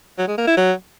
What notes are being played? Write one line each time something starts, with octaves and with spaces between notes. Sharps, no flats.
F#3
G#3
A#3
E4
F#3